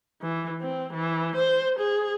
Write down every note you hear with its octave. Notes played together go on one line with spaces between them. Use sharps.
E3
C4
E3
C5
G#4